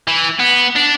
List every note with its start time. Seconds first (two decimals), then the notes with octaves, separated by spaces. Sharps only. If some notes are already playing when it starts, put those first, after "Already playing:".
0.08 E3
0.39 B3
0.76 D4